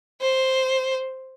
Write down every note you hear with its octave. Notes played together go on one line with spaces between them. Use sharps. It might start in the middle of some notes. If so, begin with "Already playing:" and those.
C5